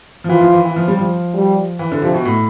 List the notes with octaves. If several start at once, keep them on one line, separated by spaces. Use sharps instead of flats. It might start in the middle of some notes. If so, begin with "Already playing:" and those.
F3
E3 F4
F3
E3
E3
F3
G3
F3
G3
E3
D3
C3 F3
B2
A2